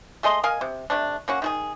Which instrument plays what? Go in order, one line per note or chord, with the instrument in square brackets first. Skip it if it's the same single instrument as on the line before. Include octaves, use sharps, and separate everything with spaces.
[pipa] A3 G#4 D#5 C6
A#4 D#5 F5 G#5
C3
C3 A3 D4
A#3 C#4 F#4
D#3 F#4 G#4